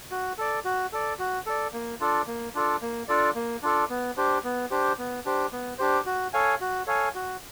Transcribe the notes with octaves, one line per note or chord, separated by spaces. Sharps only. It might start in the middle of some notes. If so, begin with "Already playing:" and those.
F#4
A4 D5
F#4
A4 D5
F#4
A4 D5
A#3
D4 F4 A4 D5
A#3
D4 F4 A4 D5
A#3
D4 F4 A4 D5
A#3
D4 F4 A4 D5
B3
D4 G4 C5
B3
D4 G4 C5
B3
D4 G4 C5
B3
D4 G4 C5
F#4
A4 C#5 F5 G#5
F#4
A4 C#5 F5 G#5
F#4